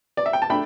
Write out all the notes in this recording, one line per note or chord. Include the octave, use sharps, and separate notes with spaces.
D5
E5
G5
A5
A3 D4 G5 B5